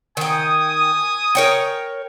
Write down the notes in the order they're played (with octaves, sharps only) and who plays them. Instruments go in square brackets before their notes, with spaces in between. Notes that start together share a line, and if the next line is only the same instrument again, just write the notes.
[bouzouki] D#3 G5 [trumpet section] G#5 D#6
[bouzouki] A#4 C#5 G5